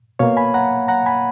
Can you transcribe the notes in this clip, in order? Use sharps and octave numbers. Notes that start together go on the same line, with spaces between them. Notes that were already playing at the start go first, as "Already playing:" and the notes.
B2 A#3 C#5 F5
G#5 B5
F#5 A#5
F#5 A#5
G#5 B5